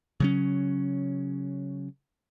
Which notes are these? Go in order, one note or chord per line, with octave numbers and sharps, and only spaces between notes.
C#3 F#3 C#4